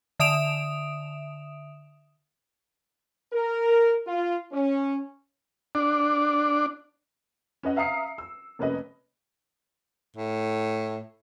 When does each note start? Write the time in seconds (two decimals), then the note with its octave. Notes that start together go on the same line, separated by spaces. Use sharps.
0.20 D3 E5 D#6 D7 E7 F7
3.33 A#4
4.07 F4
4.52 C#4
5.75 D4
7.63 C#4 B4 D#5 F#5
7.76 E5 F5 A#5 D#6 C7 C#7
8.18 E6
8.59 F1 A#3 C#4 B4 D#5
10.17 A2